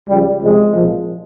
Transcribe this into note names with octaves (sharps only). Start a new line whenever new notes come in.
C#2 C#3 F3 G3
C2 C3 F3 G#3
C2 A#2 F3